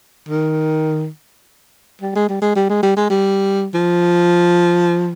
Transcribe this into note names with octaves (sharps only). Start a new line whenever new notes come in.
D#3
G3
G#3
G3
G#3
G3
G#3
G3
G#3
G3
F3